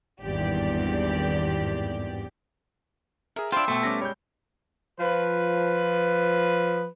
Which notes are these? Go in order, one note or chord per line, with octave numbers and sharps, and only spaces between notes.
G#1 E2 G2 G4 D5
G#4 A#4 E5
D4 F4 C5 E5 G5 B5 D6
B2 A3 G5 C6 C#6 E6
G3 B3 C#4 D6 A#6
G3 G#3 G4 C#5 G6
F3 B4